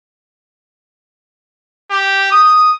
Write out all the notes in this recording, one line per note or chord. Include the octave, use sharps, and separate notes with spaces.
G4
D#6